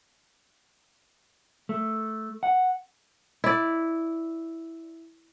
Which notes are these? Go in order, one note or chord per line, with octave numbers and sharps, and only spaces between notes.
A3
F#5
E4 D5